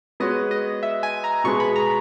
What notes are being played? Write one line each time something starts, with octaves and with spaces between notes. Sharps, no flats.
G#3 B3 F#4 C#5 D#5
D#5
E5
G#5
A#5
B2 G#3 B3 C#6
B5
A#5